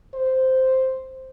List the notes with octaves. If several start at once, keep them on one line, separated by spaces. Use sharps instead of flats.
C5